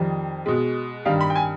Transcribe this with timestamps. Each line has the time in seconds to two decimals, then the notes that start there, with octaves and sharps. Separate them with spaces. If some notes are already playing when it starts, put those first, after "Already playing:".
Already playing: F2 D#3 G3
0.46 B2 G#3
1.05 G2 D#3 G3 F5
1.21 B5
1.30 G5
1.35 G#5